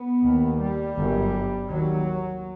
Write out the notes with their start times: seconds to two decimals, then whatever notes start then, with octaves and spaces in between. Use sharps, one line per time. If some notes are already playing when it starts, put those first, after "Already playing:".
Already playing: B3
0.25 D#2
0.62 G3
0.97 G1 F#2
1.69 D#2 F#3